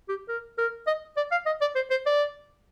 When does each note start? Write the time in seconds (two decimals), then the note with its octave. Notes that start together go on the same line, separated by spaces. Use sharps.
0.09 G4
0.28 A#4
0.58 A#4
0.87 D#5
1.17 D5
1.31 F5
1.46 D#5
1.61 D5
1.75 C5
1.91 C5
2.06 D5